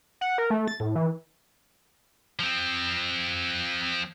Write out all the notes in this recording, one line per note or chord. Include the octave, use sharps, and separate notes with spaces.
F#5
A#4
A3
A6
A2
E3
F3 C4